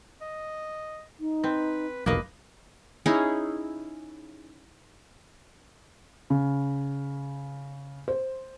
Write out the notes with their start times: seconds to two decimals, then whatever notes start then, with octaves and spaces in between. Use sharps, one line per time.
0.21 D#5
1.20 D#4
1.44 C4 B4
2.06 F1 B1 A#3 B4 D#5 F5
3.06 C#4 D#4 E4 G#4
6.30 C#3
8.08 C5